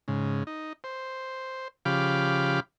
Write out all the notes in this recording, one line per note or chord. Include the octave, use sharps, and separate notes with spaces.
G#2 C#3
D#4
C5
C#3 F3 G4 F5 B5 D6